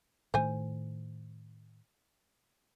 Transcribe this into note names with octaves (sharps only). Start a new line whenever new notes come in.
A2 D#3 A3 C5 G#5